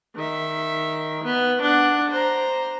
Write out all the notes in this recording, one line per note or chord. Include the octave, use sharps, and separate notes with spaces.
D#3 E5
B3
D4 F#5
C5 A#5